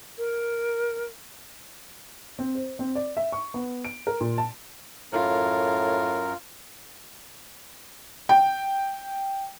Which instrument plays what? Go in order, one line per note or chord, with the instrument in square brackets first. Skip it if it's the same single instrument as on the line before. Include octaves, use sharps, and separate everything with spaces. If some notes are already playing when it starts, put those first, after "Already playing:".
[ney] A#4
[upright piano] C4
C5
C4
D5
E5
C#6
B3
D7
A#4
A#2
A5
[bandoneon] F#2 A#4 [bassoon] A2 [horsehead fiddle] F4
[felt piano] G5